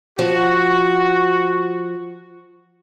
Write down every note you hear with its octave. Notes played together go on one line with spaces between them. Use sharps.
F3 F#4